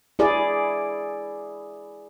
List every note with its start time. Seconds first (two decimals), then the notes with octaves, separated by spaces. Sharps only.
0.19 E4 G#4 D5